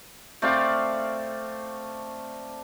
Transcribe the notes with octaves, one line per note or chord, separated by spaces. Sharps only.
A3 C4 D5 F5